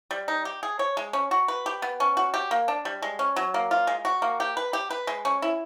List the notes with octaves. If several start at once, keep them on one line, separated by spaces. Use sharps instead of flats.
G3
D#4
G4
G#4
C#5
G#3
C#4
F#4
B4
G4
B3
C#4
F#4
G4
A#3
D4
G3
G#3
C#4
F#3
A#3
F4
G#3
F#4
A#3
G4
B4
G4
B4
G#3
C#4
E4